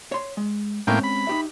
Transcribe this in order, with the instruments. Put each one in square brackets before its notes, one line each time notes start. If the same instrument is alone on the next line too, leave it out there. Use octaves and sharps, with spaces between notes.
[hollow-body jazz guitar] C#5 C6
G#3
[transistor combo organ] A2 A#3 G5 [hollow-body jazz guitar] G#3 C4 C#4
[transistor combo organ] B5
[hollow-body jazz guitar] D#4 G4 E5